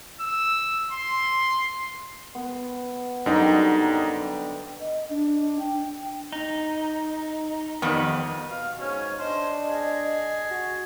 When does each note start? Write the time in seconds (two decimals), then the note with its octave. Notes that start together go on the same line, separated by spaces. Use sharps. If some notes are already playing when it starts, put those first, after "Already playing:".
0.21 E6
0.91 C6
2.35 B3
3.26 F#2 D3 G3 D#4
4.80 D#5
5.10 D4
5.60 G5
6.32 D#4
7.82 F2 D#3 G3 B3
8.50 B2 F5
8.80 G#2 C#4 C#5
9.19 D4 C5 D#5
9.68 G#4
10.51 F#4